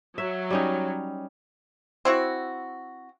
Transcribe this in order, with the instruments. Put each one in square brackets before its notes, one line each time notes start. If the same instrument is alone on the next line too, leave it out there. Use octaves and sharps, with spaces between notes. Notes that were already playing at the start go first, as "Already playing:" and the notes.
[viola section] F#3 [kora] E5
[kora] G3 C#4 D#4
[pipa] C4 E4 F#4